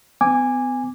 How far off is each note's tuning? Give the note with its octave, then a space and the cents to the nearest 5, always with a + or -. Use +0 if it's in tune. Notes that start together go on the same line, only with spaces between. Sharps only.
B3 +40 G#5 -15 D6 +0